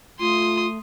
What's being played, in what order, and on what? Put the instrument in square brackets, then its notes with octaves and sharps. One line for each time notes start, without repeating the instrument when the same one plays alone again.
[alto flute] A3 [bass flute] F4 [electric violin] C6 D#6